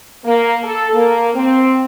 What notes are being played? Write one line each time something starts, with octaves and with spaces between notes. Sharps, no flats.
A#3
A4
A#3
C4